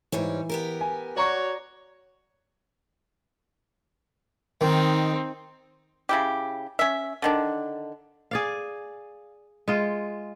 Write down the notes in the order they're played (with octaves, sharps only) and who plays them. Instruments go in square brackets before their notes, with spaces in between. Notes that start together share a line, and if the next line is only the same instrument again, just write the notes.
[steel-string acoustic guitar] G#2 G3 C#5 [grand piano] E3
[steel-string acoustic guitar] B3 G4 A#4
[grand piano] G#5
[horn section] F#4 C#5 [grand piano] D5 A#5 C#6
[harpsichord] D#3 [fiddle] C4 D#4
[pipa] C#3 E4 G4
C#4 E5
D3 D#3 D4
[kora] G#4 D5 F5
G#3 F4